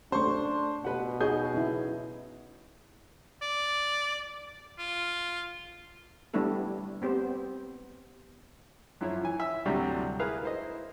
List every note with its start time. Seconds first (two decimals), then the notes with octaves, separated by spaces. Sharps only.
0.12 A3 C#4 D4 C5 C#6
0.84 B2 B4 F#5
1.20 D#4 F#4 G#4 C#5 F5 G6
1.55 C#4 E4
3.42 D5
4.79 F4
6.34 G3 A3 B3 D4 E4 A4
7.02 B3 C4 G4 C5
9.01 F#2 F3 E4 C#5
9.23 E3 G#5
9.40 E5 E6
9.66 D2 A2 C3 F#3 G3 D4
10.19 E4 G#4 A#4 B4 F5 A#5
10.43 E4 C5 D#5